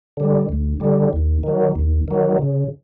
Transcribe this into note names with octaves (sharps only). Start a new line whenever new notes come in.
D3 G3
D2
D3 G3
D#2
D#3 F#3
D#2
D#3 F#3
C#3